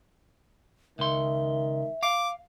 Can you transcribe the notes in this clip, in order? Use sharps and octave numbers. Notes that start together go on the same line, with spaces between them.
C#2 D#3 E5 C6
F5 D6